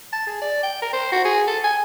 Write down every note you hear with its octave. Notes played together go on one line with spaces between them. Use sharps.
A5
G#4
D5
G5
A#4
C5
F#4
G#4
A4
G#5